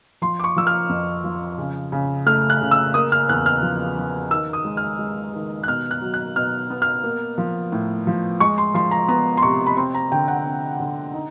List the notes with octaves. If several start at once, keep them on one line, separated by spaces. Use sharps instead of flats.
F3 C6
D6
C#6
F3 E6
F6
F2
F3
C#3
C#3
A3 F6
F#6
C#3
E6
A#3 D#6
F6
E2 F#6
F6
F3
F3
D#3 E6
D#6
G#3
F6
G#3
D#3
F#6
B2 F6
F#6
F#3
F#6
B2 F6
B3
F6
A#3
F3
A2
F3
G#3 C#6
C6
F3 C6
A#5
B3 A#5
C6
C3 C#6
B5
C4 C6
A#5
D3 G5
F#5
C4
D3
D#4